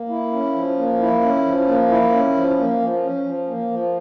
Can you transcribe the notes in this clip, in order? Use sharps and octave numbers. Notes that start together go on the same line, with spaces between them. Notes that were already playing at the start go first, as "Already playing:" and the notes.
Already playing: A#3
E4
C#4
F3
A#3
E4
C#4
F3
A#3
E4
C#4
F3
A#3
F3
C#4
F3
A#3
F3